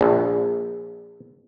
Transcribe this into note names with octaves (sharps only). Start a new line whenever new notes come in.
A#1